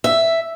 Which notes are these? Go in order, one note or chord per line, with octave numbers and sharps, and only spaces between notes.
E5